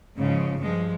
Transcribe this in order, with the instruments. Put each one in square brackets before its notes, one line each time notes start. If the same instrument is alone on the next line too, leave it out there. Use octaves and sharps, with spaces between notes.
[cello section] G#2 C#3 F3
G2 F3 G#3